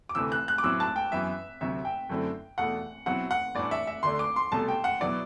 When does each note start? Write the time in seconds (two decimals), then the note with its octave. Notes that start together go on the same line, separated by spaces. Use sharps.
0.09 D6
0.15 D2 C3 E3 A3 C4 E6
0.32 F#6
0.48 F#6
0.58 D6
0.64 A2 F#3 C4 E4 E6
0.80 A5
0.96 G5
1.12 F#2 E3 B3 E5
1.61 D2 C3 F#3 E5
1.85 G5
2.09 F#2 D3 A3 C4 E4
2.58 E2 B2 A3 E4 F#5
3.06 B2 F#3 C4 E4 F#5
3.31 F#5
3.55 A2 E3 G3 D4 D5
3.71 E5
3.87 E5
4.03 D2 D3 A3 D4 C6
4.19 D6
4.36 C6
4.52 C2 B2 A3 A5
4.68 G5
4.84 F#5
5.00 B2 F#3 B3 E4 D5